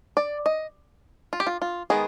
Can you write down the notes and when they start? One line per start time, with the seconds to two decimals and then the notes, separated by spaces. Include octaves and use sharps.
0.17 D5
0.46 D#5
1.33 F4
1.40 G4
1.47 F4
1.62 F4
1.90 D#3 G#3 B3 G#4